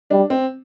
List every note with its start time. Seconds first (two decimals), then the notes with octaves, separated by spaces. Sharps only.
0.11 G3 D4
0.30 C4